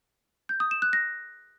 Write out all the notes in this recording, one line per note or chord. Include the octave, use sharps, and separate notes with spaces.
G6
D#6
E7
F#6
A#6